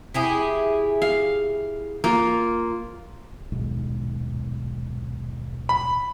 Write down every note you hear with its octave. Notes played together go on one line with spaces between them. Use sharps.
E4 G4 G#4
F5
A#3 F4
D#1 B1 G#2
B5